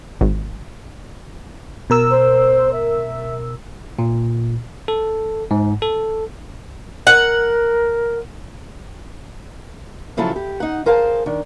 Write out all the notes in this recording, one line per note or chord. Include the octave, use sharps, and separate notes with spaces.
G#1
B2 A#4 E6
C5
E5
A#2
A4
G#2
A4
A#4 F#5
C#3 F3 F#3 E4 F4 A4
G4
D#4 F#5
G#4 A#4 C5 F5 F#5 A5
D#3 D4